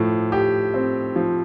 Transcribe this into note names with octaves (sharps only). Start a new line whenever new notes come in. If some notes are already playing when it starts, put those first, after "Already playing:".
Already playing: A2 F3
G4
C4
F3